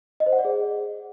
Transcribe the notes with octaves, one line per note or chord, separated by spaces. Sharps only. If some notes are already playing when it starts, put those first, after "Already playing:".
D#5
C5
F#5
D5
G#4